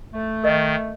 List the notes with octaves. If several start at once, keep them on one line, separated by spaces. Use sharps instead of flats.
A3
D#3 A#4 D#5